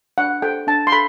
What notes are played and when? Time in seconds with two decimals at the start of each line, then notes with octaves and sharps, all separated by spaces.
0.18 D4 F#5
0.42 A4 C5 G5
0.67 D4 A5
0.87 C6
0.92 A4 B5